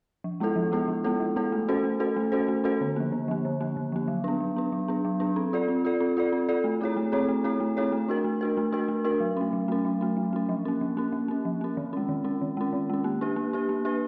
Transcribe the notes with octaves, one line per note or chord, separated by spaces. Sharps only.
F3
G#3 B3 E4 A4
F3
G#3 B3 E4 A4
F3
G#3 B3 E4 A4
F3
G#3 B3 E4 A4
A3
C#4 F#4 A4 C5
A3
C#4 F#4 A4 C5
A3
C#4 F#4 A4 C5
A3
C#4 F#4 A4 C5
D3
F3 A#3
D3
F3 A#3
D3
F3 A#3
D3
F3 A#3
F#3
B3 D4
F#3
B3 D4
F#3
B3 D4
F#3
B3 D4
C4
F4 A4 D5
C4
F4 A4 D5
C4
F4 A4 D5
C4
F4 A4 D5
A3
C4 E4 G#4 C#5
A3
C4 E4 G#4 C#5
A3
C4 E4 G#4 C#5
A3
C4 E4 G#4 C#5
A3
D4 F#4 A#4
A3
D4 F#4 A#4
A3
D4 F#4 A#4
A3
D4 F#4 A#4
F#3
A3 C#4
F#3
A3 C#4
F#3
A3 C#4
F#3
A3 C#4
F3
A#3 C#4
F3
A#3 C#4
F3
A#3 C#4
F3
A#3 C#4
D#3
G#3 C#4
D#3
G#3 C#4
D#3
G#3 C#4
D#3
G#3 C#4
A#3
D4 G4 B4
A#3
D4 G4 B4
A#3
D4 G4 B4